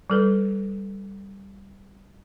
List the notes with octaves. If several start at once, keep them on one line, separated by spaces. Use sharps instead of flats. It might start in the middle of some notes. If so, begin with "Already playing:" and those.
G3 A4 B4